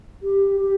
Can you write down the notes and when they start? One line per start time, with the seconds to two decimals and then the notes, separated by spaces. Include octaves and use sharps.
0.22 G4
0.60 G4